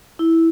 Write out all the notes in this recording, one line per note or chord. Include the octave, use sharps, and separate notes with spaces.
E4